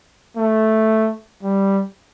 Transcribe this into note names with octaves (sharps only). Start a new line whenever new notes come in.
A3
G3